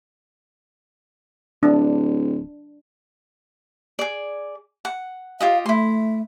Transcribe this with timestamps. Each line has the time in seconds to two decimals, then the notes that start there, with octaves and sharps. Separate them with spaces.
1.63 D1 D4
3.99 G#4 D5
4.85 F#5
5.40 F4 G4 D#5 F5
5.66 A3 E4 C6